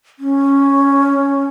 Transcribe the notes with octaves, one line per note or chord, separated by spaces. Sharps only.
C#4